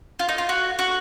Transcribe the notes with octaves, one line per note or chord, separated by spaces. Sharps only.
F4
D#4
F4
F#4
F#4